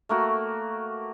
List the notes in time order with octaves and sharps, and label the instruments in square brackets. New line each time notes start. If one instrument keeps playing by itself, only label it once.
[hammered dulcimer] A3 A#3 F#4